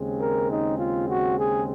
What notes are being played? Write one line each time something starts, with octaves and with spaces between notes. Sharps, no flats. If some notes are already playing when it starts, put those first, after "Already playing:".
Already playing: D#2 C#3 G#3 C4
A#4
D#4
F4
F#4
G#4